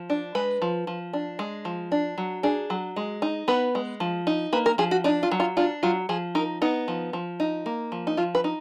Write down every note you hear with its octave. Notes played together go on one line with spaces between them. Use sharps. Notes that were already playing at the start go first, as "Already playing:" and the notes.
Already playing: F3
D4
G#3 B4
F3
F3
D4
G#3
F3
D4
F#3
D4 G#4
F#3
G#3
D#4
B3 B4
G#3
F3
D#4
A#3 B4
A#4
F3 G#4
F#4
D4 D#4
F4
F#3
F4
D4 F4
F#3 F4
F3 G#4
D#4 A#4
B3 D#4
F3
F3
D#4
A#3
F3
D#4
F3 F4
B4
D#4